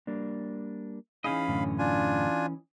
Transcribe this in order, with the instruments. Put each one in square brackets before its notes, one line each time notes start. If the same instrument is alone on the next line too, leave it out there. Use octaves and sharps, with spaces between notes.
[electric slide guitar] G3 A#3 D4
[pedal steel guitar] E3 C#4 D#5 [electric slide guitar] D#4 G#4 [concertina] F5 B5
[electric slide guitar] F#2 A2 D3
[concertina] D4 F4 G#5